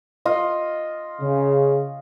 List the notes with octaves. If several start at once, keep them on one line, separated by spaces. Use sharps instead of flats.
F4 D#5
C#3